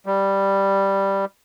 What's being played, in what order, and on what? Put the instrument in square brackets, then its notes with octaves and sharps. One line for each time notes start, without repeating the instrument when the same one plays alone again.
[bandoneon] G3